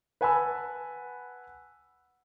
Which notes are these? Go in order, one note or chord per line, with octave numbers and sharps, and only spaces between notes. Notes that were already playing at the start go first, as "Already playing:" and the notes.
B4 F#5 G#5 A5 B5 E6